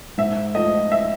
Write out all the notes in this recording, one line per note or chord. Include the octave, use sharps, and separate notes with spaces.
G#2 E5
F3 A3 D#5
E5